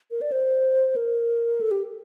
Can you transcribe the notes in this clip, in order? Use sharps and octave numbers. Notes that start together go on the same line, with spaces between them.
A#4
D5
C5
A#4
A4
G4